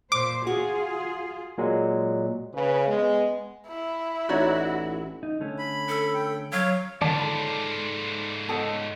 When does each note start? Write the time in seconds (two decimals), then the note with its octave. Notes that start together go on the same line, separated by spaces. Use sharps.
0.12 A#2 C5 D6
0.47 F4 F#4 G#4
1.58 A#2 F#3 G#3
2.52 C#3 B4
2.87 G#3 B3
3.67 E4
4.29 A1 D#4 F#4 C#5 D5
5.23 D#4
5.40 D3 A3 C#4
5.59 B5
5.89 A4
6.14 G5
6.52 F#3 C#5 F5
7.02 G#2 D3 D#3 F4 D5 A5
7.19 A4 B5
8.49 B3 A4 D#5 F#5